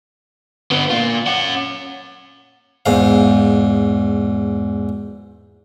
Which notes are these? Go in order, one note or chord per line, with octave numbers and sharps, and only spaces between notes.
D3 B3
A#2 F4
C#4 F#5
E2 G#2 F5